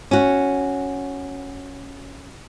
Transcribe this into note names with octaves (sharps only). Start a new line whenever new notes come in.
C#4 F#4